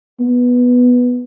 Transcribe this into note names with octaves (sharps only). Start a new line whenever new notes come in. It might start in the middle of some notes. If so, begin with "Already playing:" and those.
B3